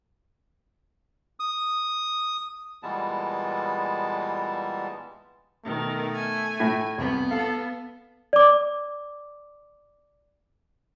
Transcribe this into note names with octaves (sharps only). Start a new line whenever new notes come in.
D#6
A#2 E3 G3 G#3 B3 A5
B2 D#3 A3
G#5
A2
C2 B3
A4 F5
D5 D6